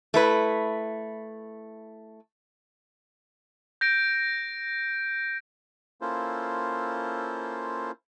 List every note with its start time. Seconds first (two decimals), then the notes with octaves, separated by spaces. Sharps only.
0.14 A3 E4 B4
3.81 G6 A#6 D7
6.01 A#3 C#4 E4 F4 A4 C5